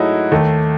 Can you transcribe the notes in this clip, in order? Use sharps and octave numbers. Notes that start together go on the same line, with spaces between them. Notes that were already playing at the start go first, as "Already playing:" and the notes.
Already playing: G#2 F#3 A3 D#4 E4 F#4
D#2 D#3 A3